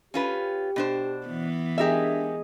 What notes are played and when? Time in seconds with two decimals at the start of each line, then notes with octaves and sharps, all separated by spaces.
0.14 C#4 F4 G4 B4
0.76 B2 D4 C5
1.27 E3 B3
1.78 D4 G4 G#4 A#4 D#5 E5